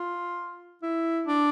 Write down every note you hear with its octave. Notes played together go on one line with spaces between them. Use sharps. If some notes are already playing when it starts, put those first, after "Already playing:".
Already playing: F4
E4
D4